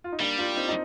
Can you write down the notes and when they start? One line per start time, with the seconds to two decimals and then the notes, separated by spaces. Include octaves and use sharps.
0.04 F4
0.12 D#4
0.20 G3 A#3 D4
0.38 D4 F4
0.56 C4 D#4
0.69 D#4